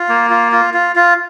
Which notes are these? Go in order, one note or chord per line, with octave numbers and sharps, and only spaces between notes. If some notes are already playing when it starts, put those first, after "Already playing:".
Already playing: F4
A#3
F4
F4
F4
F4